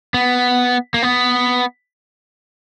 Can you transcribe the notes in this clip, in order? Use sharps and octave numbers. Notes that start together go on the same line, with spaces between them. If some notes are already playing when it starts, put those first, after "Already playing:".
B3
A#3
B3